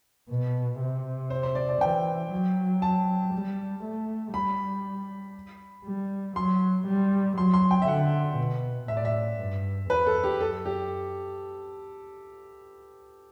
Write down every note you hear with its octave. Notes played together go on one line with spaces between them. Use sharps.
B2
C3
C5
C5
D5
D5
E3 G5
F#3
A5
G3
A3
G3 B5
G3
F#3 C6
G3
F#3 C6
C6
G5
E5
D3 F#5
B2
A2 E5
D5
E5
G2
E2 B4
A4
G4
F#2 A4
G4